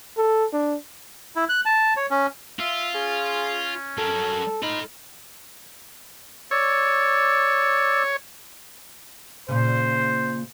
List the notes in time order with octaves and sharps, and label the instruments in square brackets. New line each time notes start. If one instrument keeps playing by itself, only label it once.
[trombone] A4
D4
[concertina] E4
F#6
A5
C#5
C#4
[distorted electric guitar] F4 [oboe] E5
[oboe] C#4 [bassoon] G#4
[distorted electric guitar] F#3 A#4 [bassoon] A4
[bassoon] D#4 [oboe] F4 [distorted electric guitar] A4 B5
[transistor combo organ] C#5 [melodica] D5 E6
[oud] A#2 C#3 [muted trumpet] C5